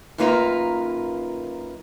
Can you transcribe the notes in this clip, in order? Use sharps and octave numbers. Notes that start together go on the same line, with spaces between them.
F#2 D#3 A#3 F4 B4 A#5